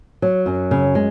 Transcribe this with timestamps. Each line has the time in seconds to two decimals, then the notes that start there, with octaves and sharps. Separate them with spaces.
0.22 F#3
0.46 F#2
0.71 C#3
0.95 G#3